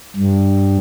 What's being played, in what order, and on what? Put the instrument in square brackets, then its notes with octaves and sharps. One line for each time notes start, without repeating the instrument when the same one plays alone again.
[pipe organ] G2